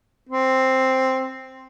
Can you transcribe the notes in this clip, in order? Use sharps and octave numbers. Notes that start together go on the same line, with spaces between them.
C4